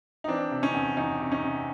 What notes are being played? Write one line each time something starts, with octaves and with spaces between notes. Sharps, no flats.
D#4
E3 C4 D4
C3
C#4 D#4
E2
E2 C#4 D#4
C3
C#4 D#4
C3